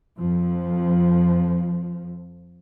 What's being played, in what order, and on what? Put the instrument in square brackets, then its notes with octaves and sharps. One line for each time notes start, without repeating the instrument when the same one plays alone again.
[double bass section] F2 F3